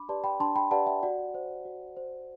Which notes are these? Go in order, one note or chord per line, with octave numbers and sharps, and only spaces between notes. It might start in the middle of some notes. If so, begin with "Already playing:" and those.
Already playing: D4 B5 D6
G4 B4 D5 A5 C6
G5 B5
D4 A5 C6
G5 B5
G4 B4 D5 F#5 A5
E5 G5
F#4 D5 F#5
C5
F#4
C5